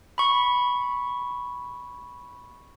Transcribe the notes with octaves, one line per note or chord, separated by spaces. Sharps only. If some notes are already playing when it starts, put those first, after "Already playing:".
B5 C#6